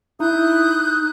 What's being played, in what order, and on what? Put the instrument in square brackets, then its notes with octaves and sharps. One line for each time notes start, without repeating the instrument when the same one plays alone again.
[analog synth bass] D#4 [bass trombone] E4 [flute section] D#6 F#6 G6